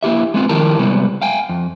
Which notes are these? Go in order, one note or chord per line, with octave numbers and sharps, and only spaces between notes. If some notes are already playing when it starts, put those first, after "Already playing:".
A#3 E4 G4 E5
G#3 B3 C4 F4
D#3 F3 E4 G4 A#4 A5
C3 G3 G#3 B3
F5 G5 G#5
F2